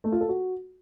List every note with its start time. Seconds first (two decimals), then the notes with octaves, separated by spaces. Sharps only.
0.04 A3
0.12 F4
0.21 A4
0.29 F#4